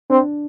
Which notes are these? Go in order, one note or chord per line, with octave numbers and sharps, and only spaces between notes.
C4 D4